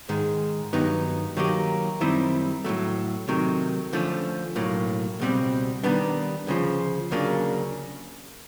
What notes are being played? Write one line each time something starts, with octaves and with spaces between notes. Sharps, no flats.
G#2 D#3 G#3
G2 D#3 F#3 B3 D#4
D#3 F#3 A#3 D#4 G4
F#2 D#3 G3 C4 E4
A2 F#3 A3
C3 D#3 F#3 A3
D3 F3 A3 C#4
B1 A2 F#3 A#3
C#2 B2 G3 C4
D#3 G3 B3 D4
D2 C#3 F3
D2 C#3 F#3 A#3 D4